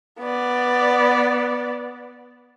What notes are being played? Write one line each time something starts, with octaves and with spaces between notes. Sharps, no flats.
B3 D5